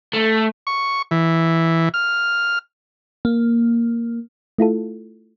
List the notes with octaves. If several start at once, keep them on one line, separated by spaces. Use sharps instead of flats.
A3
C#6
E3
F6
A#3
A3 E4 F4 A4